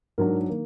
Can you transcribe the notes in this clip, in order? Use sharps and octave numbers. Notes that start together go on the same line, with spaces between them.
G#2 F#3 D4 A#4
D#3 A#3